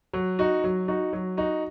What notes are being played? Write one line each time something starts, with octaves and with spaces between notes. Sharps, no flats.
F#3
D#4 F#4
F#3
D#4 F#4
F#3
D#4 F#4